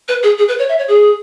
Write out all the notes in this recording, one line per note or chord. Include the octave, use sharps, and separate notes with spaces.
B4
G#4
G#4
B4
C#5
E5
C#5
G#4